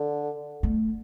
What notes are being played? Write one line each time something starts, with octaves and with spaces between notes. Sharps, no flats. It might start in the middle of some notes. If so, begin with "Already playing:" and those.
Already playing: D3
A3